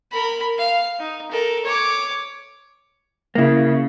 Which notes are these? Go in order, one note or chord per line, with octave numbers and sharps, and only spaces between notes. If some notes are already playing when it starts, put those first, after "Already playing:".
A#4 B5
F5
D#4
A4 A#4
C#5 D6
C#3 A#3 E4